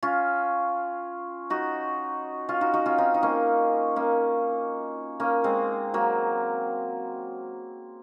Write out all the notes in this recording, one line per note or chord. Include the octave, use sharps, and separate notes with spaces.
C#4 F4
D#4 F#4
C#4 F4
D#4 F#4
D#4 F#4
C#4 F4
C4 D#4
D#4
A#3 C#4
A#3 C#4
A#3 C#4
G#3 C4
F#3 A#3